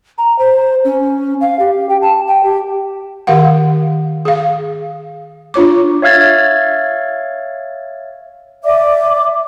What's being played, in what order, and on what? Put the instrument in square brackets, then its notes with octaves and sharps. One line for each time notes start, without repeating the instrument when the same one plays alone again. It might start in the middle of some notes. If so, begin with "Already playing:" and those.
[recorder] A#5
C5
C#4
F5
G4
G5
A5
G5
G4
[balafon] D#3 G4 F5 F#5
G#4 F5
D4 F4 C#5 D6
[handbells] C#5 E5 F5 F6 G#6 A6
[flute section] D5 E5 D6